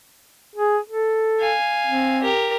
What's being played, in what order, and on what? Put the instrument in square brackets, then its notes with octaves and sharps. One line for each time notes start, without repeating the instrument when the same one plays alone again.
[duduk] G#4
A4
[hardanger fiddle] F5 G#5
[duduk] C4
[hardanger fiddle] G4 A#4